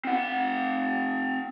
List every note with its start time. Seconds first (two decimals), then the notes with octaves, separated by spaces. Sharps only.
0.05 C4 F#5